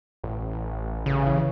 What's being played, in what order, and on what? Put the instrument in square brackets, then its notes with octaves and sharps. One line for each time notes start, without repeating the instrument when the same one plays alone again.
[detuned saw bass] A1
[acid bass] C#3
[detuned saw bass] E3